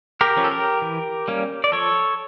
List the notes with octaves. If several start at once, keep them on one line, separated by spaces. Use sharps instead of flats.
G4 A#4
F3 C#4
A4
G4 A#4
E3
G3 A#3 C#4
D5
F3 A4 C#5